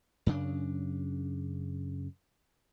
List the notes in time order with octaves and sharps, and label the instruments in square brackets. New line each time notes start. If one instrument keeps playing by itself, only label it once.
[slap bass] F#2 C#3 D4